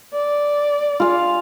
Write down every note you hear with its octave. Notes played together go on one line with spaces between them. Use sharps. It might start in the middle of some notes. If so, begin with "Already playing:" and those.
D5
F4 G#4 F5